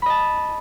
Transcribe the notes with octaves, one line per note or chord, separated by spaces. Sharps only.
D#5 A5 B5